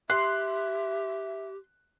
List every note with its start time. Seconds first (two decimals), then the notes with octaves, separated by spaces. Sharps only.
0.10 G4 E5 C6 F#6